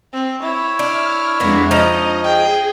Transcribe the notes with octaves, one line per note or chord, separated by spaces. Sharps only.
C4
E4 C#5
D4 F6
F2 G#3 A#3 B3 D4
F3 D#4 D#5 A#5
G#4 G5